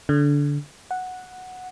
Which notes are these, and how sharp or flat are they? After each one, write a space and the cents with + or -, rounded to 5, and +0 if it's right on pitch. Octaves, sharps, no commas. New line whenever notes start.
D3 -20
F#5 -5